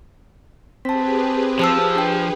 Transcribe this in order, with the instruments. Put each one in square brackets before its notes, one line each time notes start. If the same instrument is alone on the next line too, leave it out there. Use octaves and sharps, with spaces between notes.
[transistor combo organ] C4 [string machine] G4 G#4 B4 [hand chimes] A5 B6
[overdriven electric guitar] F3 [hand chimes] C5 A5 E6
[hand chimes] D4 G5